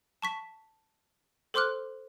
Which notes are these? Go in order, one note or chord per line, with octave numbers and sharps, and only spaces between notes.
A5 C#6 B6
A4 C5 C6 D6 F6 F#6